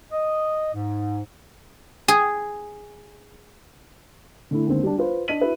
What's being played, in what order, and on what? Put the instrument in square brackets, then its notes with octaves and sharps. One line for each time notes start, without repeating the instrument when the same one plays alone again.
[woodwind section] D#5
G#2
[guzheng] G#4
[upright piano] D3 A3 E4
D#2 D3 G#3 C4
G3 D4
F4 B4 C5
D4 D#5 B6 D#7 F#7
E4 F#4 B4 E5